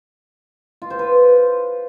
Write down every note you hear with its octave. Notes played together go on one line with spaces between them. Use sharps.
F4
C5
B4